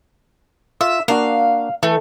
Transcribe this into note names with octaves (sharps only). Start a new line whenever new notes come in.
F4 E5
A#3 D4 F#4 F5
E3 A3